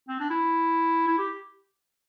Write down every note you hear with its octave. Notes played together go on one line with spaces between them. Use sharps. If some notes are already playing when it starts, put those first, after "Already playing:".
C4
D4
E4
E4
G4